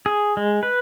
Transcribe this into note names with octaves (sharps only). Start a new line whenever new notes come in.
G#4
G#3
B4